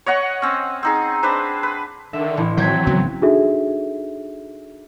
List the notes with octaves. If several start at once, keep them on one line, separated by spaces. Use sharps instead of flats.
C#5 D#5 F#5 C#6
C4 C#4
C4 D#4 G#4
C4 D4 B4 C5
B4
D3 D#3 E5
A1 E4
D#3 E3 F#3 C4 G6 G#6 B6
G#1 C#3 B3
D4 D#4 F#4 G#4 A4 E5